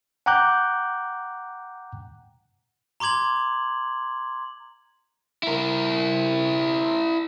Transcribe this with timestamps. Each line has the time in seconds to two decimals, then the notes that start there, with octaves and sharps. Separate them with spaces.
0.26 F#5 G5 A#5 D6 F#6 G6
3.00 A#5 C6 D6 G#6 F#7
5.43 E4 A#4